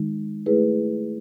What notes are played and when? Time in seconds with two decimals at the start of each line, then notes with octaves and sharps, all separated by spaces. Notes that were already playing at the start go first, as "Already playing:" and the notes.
Already playing: D#3 G#3 D#4
0.46 A3 E4 G#4 B4